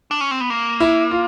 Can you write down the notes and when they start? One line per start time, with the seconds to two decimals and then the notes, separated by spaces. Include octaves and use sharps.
0.11 D4
0.21 C#4
0.31 C4
0.41 B3
0.50 A#3
0.80 E4
1.11 F4